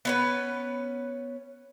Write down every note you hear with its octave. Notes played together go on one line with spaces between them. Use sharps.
B3 C#4 B4